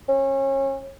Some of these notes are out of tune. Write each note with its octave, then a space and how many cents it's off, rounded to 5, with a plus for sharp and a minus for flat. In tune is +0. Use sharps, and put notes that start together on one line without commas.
C#4 -30